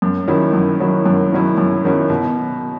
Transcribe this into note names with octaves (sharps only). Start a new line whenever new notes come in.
F#2
D#3 F#3 C#4 E4
F#2
D#3 F#3 C#4 E4
F#2
D#3 F#3 C#4 E4
F#2
D#3 F#3 C#4 E4
B2